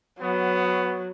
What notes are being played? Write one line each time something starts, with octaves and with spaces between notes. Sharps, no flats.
F#3 B3